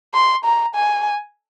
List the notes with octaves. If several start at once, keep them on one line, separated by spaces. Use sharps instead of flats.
C6
A#5
G#5